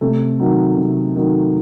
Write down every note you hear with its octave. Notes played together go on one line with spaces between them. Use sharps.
C3 A3
D#3 F#3
C3
D#3 F#3